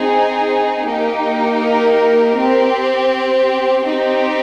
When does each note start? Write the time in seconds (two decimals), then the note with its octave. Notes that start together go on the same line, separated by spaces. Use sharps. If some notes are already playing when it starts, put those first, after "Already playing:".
Already playing: C4 D#4 G#4
0.87 A#3 D#4 G4
1.62 A#4
2.36 C4 G4
3.85 C4 D#4 G4